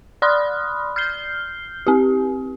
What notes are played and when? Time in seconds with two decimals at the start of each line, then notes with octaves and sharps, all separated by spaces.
0.22 D5 B5 C6 D#6 F6 F#6
0.96 F6 G6 C7 G7
1.87 C4 G4